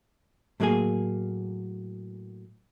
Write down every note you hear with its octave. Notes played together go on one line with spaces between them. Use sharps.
A2 F#3 G3 A#3 G#4 G#5